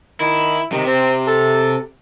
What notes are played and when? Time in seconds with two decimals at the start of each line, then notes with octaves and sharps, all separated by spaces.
0.20 D#3 E4
0.72 C3 D#3
0.87 C4
1.27 A4